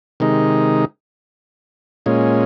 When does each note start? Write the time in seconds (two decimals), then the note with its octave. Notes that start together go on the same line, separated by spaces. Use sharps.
0.20 C3 D#3 G#3 D#4
2.06 A#2 G#3 C#4